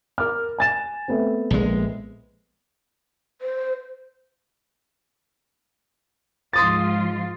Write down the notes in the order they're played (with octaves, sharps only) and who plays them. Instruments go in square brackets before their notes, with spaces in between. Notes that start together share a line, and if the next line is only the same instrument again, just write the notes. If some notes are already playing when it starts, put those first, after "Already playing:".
[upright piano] A#4 D6 F6
G#5 A6 E7
A3 B3 C4
[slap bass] A#1 G#3
[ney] C5
[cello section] G#2 F3 F4 [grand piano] C6 D#6 A6